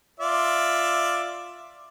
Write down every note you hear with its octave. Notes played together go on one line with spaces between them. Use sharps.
F4 D5 E5